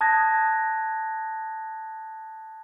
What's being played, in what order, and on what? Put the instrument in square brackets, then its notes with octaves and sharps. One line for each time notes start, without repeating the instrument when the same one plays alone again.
[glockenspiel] A5 D#6 F#6 G#6 A#6